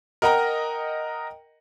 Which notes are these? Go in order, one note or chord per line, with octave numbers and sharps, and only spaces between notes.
A#4 D#5 F#5 G5 A#5